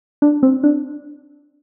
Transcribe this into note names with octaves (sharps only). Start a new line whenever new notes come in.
D4
C4
D4